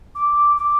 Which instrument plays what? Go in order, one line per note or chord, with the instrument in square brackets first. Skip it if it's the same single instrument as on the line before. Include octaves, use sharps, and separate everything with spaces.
[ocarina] D6
D6